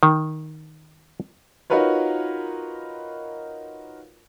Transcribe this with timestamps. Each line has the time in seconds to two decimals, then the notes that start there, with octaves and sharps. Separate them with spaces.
0.03 D#3
1.70 D#4 F4 F#4 A#4 B4 C#5